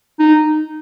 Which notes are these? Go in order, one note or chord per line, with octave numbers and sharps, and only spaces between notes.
D#4